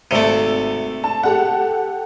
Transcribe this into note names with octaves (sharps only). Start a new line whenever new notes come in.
G#1 C3 A3 E6 D7
A5
G4 A4 F#5